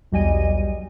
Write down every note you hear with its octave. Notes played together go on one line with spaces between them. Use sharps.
B1 E2 G3 D#5 G#5 D#7